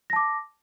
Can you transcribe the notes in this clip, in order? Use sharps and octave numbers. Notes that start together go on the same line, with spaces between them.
A5 D6 A#6